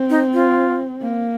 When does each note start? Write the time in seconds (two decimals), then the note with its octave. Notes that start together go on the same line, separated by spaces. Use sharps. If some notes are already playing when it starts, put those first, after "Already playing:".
Already playing: C4
0.10 D#4
0.33 F4
1.02 A#3